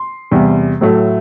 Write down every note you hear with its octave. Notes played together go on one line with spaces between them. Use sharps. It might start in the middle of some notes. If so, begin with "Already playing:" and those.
Already playing: C6
E2 C3 G3
A2 F#3 A3